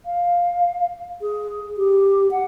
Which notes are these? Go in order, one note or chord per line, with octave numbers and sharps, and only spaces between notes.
F5
G#4
G4
F#5